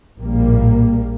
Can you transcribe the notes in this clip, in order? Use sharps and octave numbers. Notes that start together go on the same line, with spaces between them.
A#1 A2 G3 A#3